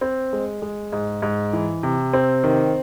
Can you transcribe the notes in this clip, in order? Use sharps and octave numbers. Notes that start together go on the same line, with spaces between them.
C4
G#3
G#3
G#2
G#2
E3
C3
C4
D#3